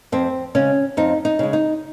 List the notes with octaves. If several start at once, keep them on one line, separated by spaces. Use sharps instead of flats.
F2 C4
C#3 G#3 C#4
F2 D#4
D#4
C#3 G#3
D#4